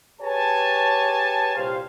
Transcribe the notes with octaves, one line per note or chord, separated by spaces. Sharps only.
G4 G#4 B4 C#5 G#5 A5
C2 A#2 G4 C5 F5